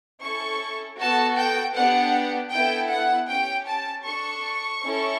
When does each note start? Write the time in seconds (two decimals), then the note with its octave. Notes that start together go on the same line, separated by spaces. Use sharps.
0.23 C#4 E4 A4 C#6
0.99 B3 F#4 A4 A5
1.37 G5
1.75 B3 D4 G4 F#5
2.52 B3 E4 A4 G5
2.91 F#5
3.28 C#4 G4 G5
3.68 A5
4.05 D4 A4 C#6
4.83 C#4 E4 A4